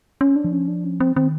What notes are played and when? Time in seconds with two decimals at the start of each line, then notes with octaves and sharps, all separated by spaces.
0.21 C#4
0.36 D4
0.44 F3
0.52 C#4
0.68 D4
0.84 C#4
1.00 C4
1.16 D#3 C4